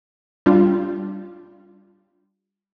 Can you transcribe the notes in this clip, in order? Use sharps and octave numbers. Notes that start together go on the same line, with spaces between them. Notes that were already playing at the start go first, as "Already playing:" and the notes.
G3 D4 F4